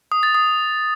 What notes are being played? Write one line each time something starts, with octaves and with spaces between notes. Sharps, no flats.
D#6
A6
D#6